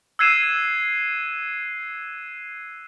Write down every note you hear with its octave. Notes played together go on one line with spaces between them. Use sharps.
E6 F#6 G#6 C7 D#7 E7